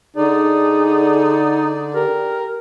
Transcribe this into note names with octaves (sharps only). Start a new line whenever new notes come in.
D3 D#4 G#4 D5
G4 A#4